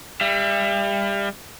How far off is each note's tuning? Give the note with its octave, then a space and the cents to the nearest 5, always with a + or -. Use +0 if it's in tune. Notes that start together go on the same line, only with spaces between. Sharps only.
G3 +30 E5 +40